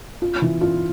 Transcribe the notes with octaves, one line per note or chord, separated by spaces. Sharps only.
F4
E3
F4